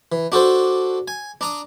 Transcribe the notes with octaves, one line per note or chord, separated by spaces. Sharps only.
E3
D4 F#4 A4 C5
G#5
D4 A#5 D#6